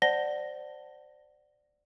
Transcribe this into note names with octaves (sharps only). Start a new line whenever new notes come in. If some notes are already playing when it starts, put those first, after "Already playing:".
C5 D5 F#5 A5 A#6 G7